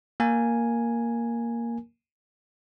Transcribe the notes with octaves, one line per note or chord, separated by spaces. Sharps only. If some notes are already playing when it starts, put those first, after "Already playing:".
A#3 A#4 G#5